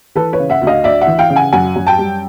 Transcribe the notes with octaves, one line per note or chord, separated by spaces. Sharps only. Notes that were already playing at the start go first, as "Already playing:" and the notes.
E3 A4 B4
B4 C#5
C#3
E5 F#5
D2
D#5 F5
D2 D5 E5
E5 F#5
E3
F5 G5
C#3
F#5 G#5
F#2 F#5 G#5
F#2
G5 A5
G3